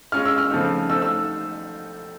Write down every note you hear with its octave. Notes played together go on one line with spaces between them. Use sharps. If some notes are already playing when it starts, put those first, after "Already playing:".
G#3 C#4 F4 F6
E6
F6
C#3 F3 A3 C4 D#4
A3 C4 D#4 E6
E6